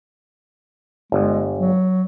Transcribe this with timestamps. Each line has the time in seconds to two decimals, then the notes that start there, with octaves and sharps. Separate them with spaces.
1.12 G1 G#3
1.59 F#3